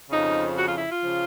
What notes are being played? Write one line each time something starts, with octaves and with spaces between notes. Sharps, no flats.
F2 C#3 F3 D#4
F#4
F4
E4
F4
C#3 F3